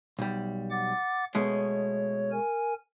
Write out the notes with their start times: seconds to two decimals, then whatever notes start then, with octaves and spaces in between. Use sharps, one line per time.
0.19 B1 G3
0.71 F#5 D6 A6
1.35 B2 G#3 A3 C#5
2.32 A#4 G#5